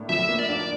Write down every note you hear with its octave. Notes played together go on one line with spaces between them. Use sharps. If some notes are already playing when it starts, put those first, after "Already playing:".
Already playing: A2 A#3 D4
F3 E5
A#3
D5
D4